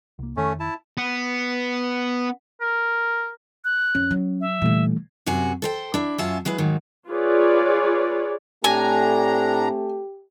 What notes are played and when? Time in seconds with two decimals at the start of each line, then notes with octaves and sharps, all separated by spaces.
0.19 C2 A#3
0.37 F2 D#3 A3 C#4
0.60 E4 A5
0.98 B3
2.61 A#4
3.65 F#6
3.95 F2 C#4
4.11 F#3
4.41 E5
4.62 A#2 D3 E3 G3 A3
5.26 F#2 C3 F#4 G#5
5.62 A4 C5 G5
5.94 D4 E4
6.18 F#2 C#4 F4 F#4 E5 A5
6.45 F#3 G#3 E4 B4
6.58 G#2 D#3 F#3
7.08 F4 G#4 B4 C#5 D5
8.64 A2 A3 C4 D4 G4 A4 G#5 A#5